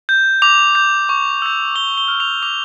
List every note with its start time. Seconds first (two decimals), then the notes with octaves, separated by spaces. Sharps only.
0.09 G6
0.42 D6 F7
0.75 G6
1.09 C#6
1.42 E6 G6
1.75 D6 G7
1.97 G7
2.08 F6
2.20 F7
2.42 D6 F7